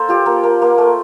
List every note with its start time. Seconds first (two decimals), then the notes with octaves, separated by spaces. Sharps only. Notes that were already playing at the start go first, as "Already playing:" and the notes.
Already playing: A#3 A4 C5
0.09 F4 G4
0.26 A#3
0.43 A#3
0.62 A#3
0.78 A3